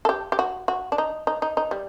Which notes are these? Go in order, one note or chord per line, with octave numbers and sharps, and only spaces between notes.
A4
G4
G4
F#4
F#4
D4
D#4
D#4
D#4
D#4
G3